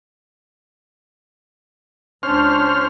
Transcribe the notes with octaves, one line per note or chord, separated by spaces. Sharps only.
C#2 C#4 D4 C5 F6